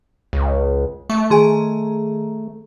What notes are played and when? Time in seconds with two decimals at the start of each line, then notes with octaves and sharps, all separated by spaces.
0.33 C#2
1.10 A3 C#6
1.30 D#3 G#4 G#5 A#5 C6